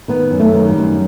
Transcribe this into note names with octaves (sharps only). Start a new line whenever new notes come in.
D#3 B3
F#2
A3
D#3
G3
F#2